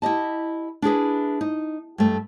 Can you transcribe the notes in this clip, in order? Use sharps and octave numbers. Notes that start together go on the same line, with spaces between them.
E4 G4 D#5 A5
D4 E4 G#4 B4
D#4
G2 A3